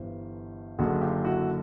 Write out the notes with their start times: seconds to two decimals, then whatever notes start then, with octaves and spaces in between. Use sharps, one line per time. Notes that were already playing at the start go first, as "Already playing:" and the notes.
Already playing: G1 G2 E3 C5
0.79 F#1 F#2 D3 F#4 G#4
1.01 F4 G4
1.24 E4 F#4